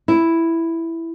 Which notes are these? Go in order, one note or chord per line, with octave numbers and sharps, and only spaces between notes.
E4